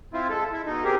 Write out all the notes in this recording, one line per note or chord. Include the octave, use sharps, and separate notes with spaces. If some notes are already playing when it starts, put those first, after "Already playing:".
C4 E4 F4
G#3 A4
E4
B2 D#4
C4 G4 G#4 A#4